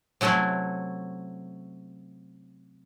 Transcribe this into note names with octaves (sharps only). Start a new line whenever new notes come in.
C3 F#3 A3 C#4 E4